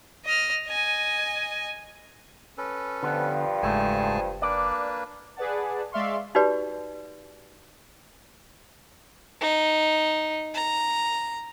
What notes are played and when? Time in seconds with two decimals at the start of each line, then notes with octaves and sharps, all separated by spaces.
0.25 D#5 F6
0.66 D#5 G#5
2.58 C#4 A4 B4
3.03 G2 D3 F3 B3
3.63 F#1 C#2 G#2 A3 G#4 G#5 A5
4.42 A#3 D4 B4 D5
5.36 G#4 B4 D5 F#5 A5
5.92 G#3 D5 E5 F5 C6 C#6
6.35 D#4 F#4 G4 B4 D5
9.41 D#4
10.55 A#5